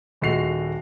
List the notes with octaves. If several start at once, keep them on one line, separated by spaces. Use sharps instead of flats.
D#1 G#3 A3 F#4 C7 F7